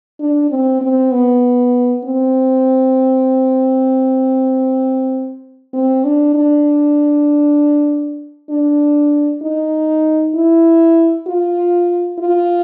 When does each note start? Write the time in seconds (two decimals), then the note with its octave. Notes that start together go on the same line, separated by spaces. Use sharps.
0.20 D4
0.51 C4
0.81 C4
1.12 B3
2.04 C4
5.74 C4
6.05 D4
6.35 D4
8.50 D4
9.43 D#4
10.35 E4
11.27 F4
12.19 F4